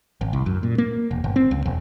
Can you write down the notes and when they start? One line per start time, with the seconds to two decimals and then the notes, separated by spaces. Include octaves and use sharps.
0.21 G#1
0.33 C2
0.46 F#2
0.63 A#2
0.78 A#3
1.11 E1
1.24 G1
1.36 C4
1.51 C#2
1.66 E1